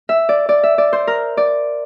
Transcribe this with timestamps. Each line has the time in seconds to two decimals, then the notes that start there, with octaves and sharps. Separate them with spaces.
0.09 E5
0.29 D5
0.49 D5
0.63 E5
0.78 D5
0.93 C5
1.07 A#4
1.37 D5